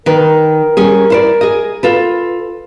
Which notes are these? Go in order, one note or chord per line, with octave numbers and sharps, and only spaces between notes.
D#3 A#4 B4
G3 C#4 G#4
E4 C5 D5
G#4 D#5
F4 A4 B4